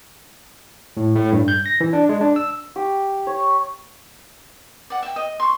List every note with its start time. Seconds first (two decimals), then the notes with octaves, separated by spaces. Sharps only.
0.97 A2
1.16 A2
1.33 G2
1.48 G6
1.66 A#6
1.81 E3
1.93 D4
2.09 G#3
2.21 D4
2.36 E6
2.76 G4
3.27 C#5
4.90 D5 F#5
5.02 E5 G5
5.16 D#5
5.40 C6 C#6